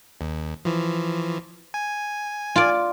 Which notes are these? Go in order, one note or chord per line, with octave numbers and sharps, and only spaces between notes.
D#2
E3 F3
G#5
F4 D5